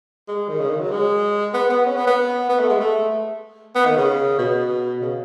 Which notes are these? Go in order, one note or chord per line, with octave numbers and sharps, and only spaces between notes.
G#3
D#3
C#3
D#3
F#3
G#3
B3
B3
C#4
B3
B3
B3
A3
G#3
A3
B3
D#3
C#3
B2
C#3